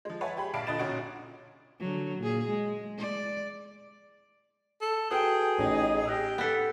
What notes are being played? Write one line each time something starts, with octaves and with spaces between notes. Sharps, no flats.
F3 G#3
B4 C#5 E5 F#5 G#5 A5
G4 G#4 B5
A#1 D5 E5 F5 A5 D7
A#2 D3 D#5 B5 A6 E7
B1 A#2 C#4 D#4 F#4 D7
D3 F#3
A#2 G#4
G#3
D5
A4
F#4 G#4 A4 B4 G5
A1 D#4 C#5 D#5
G4 G5 E6 F#6 A#6
B3 A4 F#5 B6